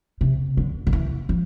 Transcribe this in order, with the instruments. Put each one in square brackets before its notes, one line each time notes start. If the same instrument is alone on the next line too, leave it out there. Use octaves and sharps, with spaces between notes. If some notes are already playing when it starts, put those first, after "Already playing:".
[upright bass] C3
D3
D3
E3
F3